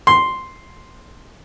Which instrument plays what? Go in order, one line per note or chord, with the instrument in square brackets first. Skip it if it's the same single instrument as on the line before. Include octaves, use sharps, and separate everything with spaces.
[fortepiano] C6